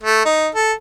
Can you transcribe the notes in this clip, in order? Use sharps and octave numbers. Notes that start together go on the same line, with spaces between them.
A3
D#4
A4